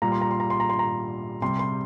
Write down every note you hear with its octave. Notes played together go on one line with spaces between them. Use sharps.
A#2 G3 A#5
C6
A#5
C6
A#5
C6
A#5
C6
A#5
C3 G3 C6
C6